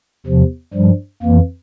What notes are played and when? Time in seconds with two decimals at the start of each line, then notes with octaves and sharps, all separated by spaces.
0.26 E2 C3 F3
0.74 G2 F3 G3
1.23 F2 E3 A#3